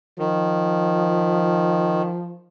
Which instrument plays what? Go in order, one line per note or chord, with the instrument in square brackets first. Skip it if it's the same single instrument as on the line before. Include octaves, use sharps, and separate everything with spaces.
[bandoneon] D#3 [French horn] F3